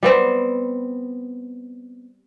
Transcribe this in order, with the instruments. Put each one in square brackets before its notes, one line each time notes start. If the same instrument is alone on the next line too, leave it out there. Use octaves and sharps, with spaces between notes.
[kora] G3 B3 C4